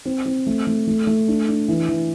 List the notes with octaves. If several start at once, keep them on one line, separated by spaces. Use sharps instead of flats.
C4
C4
A3
A3
A3
A3
D4
D4
E3
E3